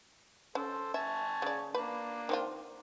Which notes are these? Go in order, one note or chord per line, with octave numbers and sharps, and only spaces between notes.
C#4 A4 C5
E5 G#5 A5 C#6
C#3 D5
A#3 D4 B4
D#3 C4 F4